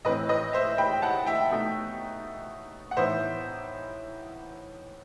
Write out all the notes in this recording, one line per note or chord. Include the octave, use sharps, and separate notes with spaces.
A2 E3 A3 C4 B4 D#5
B4 D#5
C5 E5
G5 B5
F#5 A5
E5 G5
B2 A3 D#4
F#5
A2 E3 B3 D#4 C5 E5